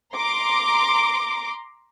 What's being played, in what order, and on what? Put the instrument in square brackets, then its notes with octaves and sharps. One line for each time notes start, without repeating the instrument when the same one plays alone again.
[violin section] A#5 C6 D6